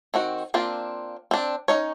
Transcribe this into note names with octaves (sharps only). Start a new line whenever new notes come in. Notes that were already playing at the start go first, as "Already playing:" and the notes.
D#3 C4 F#4
A#3 C4 D4 F4
C4 D4
C#4 D#4 C#5